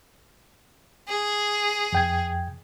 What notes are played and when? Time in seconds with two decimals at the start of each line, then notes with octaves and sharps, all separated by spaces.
1.08 G#4
1.92 F2 G5 G#6